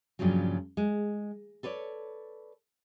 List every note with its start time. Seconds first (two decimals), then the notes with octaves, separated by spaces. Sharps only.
0.19 G2 A#2 C#3 F3 F#3
0.77 G#3
1.63 A4 B4 C#5 D5